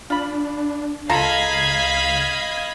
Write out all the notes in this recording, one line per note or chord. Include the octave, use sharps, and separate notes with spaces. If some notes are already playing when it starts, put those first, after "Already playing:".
D4 F4 B5
C#2 F4 A4 D#5 F5 A#5 B5 G#6